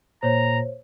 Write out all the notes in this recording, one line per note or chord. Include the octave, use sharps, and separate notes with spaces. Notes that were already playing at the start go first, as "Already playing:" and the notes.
A#2 C5 C#5 A#5